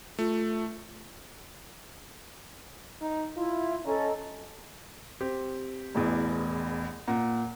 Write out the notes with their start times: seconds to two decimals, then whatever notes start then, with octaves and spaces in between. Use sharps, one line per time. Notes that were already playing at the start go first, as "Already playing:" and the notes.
0.19 A3 F4
3.02 D#4
3.37 E4 F4
3.85 C#4 A4 D#5 A#5
5.21 C4 G4
5.95 E1 A1 E2
7.07 A#2 F#5 A#5